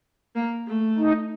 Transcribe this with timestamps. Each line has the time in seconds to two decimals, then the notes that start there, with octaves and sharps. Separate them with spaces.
0.35 A#3
0.67 A3
0.98 D#4